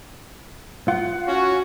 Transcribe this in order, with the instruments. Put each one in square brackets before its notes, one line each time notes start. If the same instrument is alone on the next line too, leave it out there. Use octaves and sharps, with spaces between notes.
[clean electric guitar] F4 [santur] F#5
[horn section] C#4 F#4